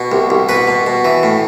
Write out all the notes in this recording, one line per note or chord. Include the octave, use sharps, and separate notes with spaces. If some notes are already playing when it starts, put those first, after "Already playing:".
Already playing: B2
C2
C2
B2 B4
B2
B2
E3
A2